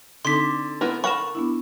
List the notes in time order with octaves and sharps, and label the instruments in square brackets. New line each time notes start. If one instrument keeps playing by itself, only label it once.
[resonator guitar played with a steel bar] D3 [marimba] C4 D#4 A4 [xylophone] C6 B6
[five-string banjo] B3 E4 A#4
[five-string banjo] A#4 F#5 B5 [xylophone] C#6 E7
[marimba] B3 D4 E4